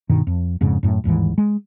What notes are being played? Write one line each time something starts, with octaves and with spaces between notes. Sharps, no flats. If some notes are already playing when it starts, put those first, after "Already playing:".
G2 B2 D#3
F2
F2 G#2 C#3
F#2 A2
G1 D#2 G#2 E3
G#3